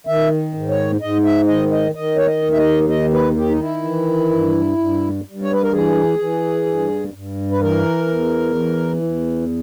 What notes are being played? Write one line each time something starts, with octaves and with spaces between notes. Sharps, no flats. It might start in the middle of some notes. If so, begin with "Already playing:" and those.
D#3 E5
G#2
C#5
G#2 D#5
E5
D#3 D#5
D#5
D#3 D#5
C#5
D#5
D#2
E5
D#5
D#3 D#5
B4
D#3 G4
D#4
E4
E3
G2
G2
G2
C#5
B4
A#4
E3 G#4
E3
G2
G2
B4
E3 A#4
E2
E3
E2